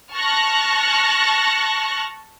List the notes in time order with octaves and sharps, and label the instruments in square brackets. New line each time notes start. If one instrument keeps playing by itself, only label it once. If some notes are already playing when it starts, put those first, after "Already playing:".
[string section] A5 C#6 F6 F#6 A#6